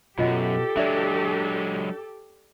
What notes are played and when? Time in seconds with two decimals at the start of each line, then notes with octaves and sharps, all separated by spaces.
0.18 F#2 B2 F4 G4 A4 D#5 F#5
0.77 F#3 G#3 D4 D5 E5